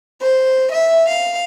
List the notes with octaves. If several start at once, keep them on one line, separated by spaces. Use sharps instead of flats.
C5
E5
F5